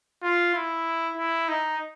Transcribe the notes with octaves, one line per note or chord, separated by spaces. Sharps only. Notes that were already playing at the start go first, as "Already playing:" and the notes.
F4
E4
E4
D#4